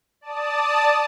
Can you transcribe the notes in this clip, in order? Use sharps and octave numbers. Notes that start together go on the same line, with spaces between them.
D5 A5 D#6